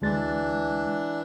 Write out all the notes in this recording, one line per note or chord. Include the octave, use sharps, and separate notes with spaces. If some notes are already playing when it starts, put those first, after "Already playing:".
D2 E3 G#3 D4 A6